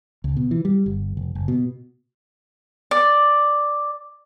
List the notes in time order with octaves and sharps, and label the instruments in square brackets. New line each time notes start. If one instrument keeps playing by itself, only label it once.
[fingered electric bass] C#2
B2
E3
G3
G1
F1
F#1
B2
[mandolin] D5